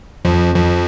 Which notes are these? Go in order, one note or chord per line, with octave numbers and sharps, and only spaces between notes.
F2 F3
F2 F3